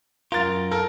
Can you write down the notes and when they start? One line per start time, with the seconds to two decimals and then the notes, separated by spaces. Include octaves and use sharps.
0.32 F#2 F4 A#4 A6
0.72 A4 A#4